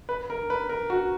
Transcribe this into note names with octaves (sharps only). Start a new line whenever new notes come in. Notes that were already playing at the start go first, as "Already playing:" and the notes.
B4
A#4
B4
A#4
F#4